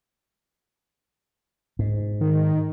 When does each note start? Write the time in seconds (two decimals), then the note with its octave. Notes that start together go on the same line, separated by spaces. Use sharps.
1.79 G#2
2.21 D#3